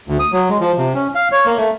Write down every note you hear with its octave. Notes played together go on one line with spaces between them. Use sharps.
D2
D#6
F#3
G#3
F3
C3
C#4
F5
C#5
A#3
A3